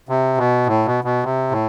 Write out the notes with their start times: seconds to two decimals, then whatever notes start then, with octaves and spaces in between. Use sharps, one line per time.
0.09 C3
0.38 B2
0.67 A2
0.86 B2
1.04 B2
1.23 C3
1.51 A2